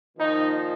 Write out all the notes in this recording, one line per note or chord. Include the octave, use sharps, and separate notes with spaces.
A#2 D#3 F3 D#4